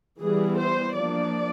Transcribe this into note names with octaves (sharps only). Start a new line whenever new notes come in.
E3 G3 B3 G#4
C5
F3 A#3 D4 D5